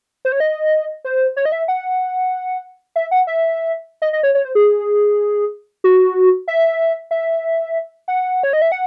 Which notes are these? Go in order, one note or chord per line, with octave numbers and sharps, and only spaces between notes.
C5
C#5
D#5
C5
C#5
D#5
E5
F#5
E5
F#5
E5
D#5
D#5
C#5
C#5
C5
G#4
F#4
E5
E5
F#5
C#5
D#5
E5
F#5